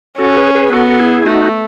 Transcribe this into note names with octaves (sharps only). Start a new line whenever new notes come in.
C#4 F#4 A4
G#4 B4
G#4 B4
B3 F#4 A4
E4 G#4
A3 D#4 F#4